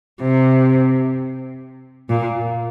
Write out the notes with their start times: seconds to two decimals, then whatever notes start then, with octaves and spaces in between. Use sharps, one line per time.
0.22 C3
2.10 A#2